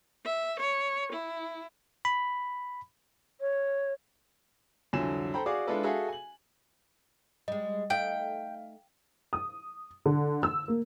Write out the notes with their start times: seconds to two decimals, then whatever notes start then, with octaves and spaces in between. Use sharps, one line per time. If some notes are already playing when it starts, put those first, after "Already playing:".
0.25 E5
0.60 C#5
1.13 E4
2.05 B5
3.40 C#5
4.93 C2 F2 D3 F#3 G#5 E7
5.34 A4 C5 G5 A#5 B5
5.46 F#4 G#4 D5 F5 D6
5.67 G#3 D4 E4 F4 A4 B4
5.83 F#4 G#4 A4 E5 F5
6.09 G#5 F#7
7.48 G3 G#3 D#5
7.90 A3 D#4 F5 G5
9.33 D#6
10.06 D3
10.43 E6
10.68 A#3